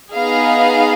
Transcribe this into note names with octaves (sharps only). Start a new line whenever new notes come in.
B3 D#4 G#4 F5